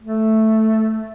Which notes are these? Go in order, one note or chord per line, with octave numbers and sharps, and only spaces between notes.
A3